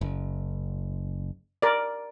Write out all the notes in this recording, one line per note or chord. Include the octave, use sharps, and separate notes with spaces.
F#1
A#4 D5